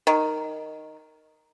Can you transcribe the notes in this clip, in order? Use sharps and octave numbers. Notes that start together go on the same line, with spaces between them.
D#3